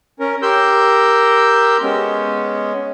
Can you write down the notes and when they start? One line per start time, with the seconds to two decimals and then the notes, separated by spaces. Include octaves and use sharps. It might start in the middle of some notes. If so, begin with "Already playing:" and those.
0.20 C#4 A#4
0.42 G4 A#4 C6 E6 G6
1.82 G#3 B3 C#4